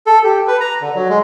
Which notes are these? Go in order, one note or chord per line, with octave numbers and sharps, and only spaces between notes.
A4
G4
B4
A#5
D3
F#3
G#3